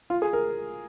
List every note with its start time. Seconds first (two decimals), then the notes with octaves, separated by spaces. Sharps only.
0.10 F4
0.22 G#4
0.33 A#4